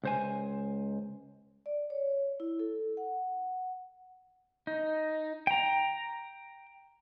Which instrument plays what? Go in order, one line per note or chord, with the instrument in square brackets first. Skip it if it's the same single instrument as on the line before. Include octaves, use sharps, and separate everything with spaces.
[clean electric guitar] C#2 C5 G#5
[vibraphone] D5
C#5
E4
A4
F#5
[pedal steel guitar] D#4
G5 A#5